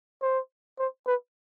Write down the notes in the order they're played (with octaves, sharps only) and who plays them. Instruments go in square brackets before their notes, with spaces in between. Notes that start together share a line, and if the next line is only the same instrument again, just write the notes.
[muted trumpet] C5
C5
B4